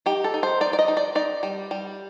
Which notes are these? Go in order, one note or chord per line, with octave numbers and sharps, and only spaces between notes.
D#4 G4
A4
D#4
C5
D#4 D5
D5
D#5
D#4
D5
D#4 D5
G3
G3